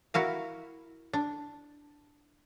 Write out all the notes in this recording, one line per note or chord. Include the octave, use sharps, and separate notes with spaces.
E4 F#4 A#4 F5
D4